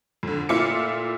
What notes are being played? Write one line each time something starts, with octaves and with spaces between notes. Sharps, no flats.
F2 D3
A#2 A3 E4 F4 D6 C#7